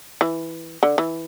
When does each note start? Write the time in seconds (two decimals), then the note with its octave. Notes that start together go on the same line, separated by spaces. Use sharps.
0.21 E3
0.83 D3
0.98 E3